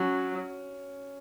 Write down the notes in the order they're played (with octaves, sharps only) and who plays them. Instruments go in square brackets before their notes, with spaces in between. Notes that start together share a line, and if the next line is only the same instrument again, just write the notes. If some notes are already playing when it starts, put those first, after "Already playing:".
Already playing: [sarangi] F#3 [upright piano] C#4